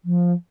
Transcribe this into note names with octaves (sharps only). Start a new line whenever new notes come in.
F3